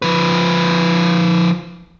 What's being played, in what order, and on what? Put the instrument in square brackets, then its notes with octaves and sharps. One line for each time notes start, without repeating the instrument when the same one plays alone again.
[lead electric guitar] F3 B4